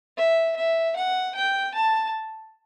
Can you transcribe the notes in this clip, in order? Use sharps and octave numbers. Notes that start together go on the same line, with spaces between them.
E5
E5
F#5
G5
A5